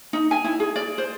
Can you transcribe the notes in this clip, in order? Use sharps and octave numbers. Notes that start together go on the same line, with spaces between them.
D#4
G#5
E4
G#4
D5
C5